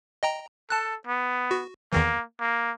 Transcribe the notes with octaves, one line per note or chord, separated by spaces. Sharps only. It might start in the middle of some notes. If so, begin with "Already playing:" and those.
D#5 G5 A#5
A4 A5 F#6
B3
F#4
E2 D#3 E3 A#3
A#3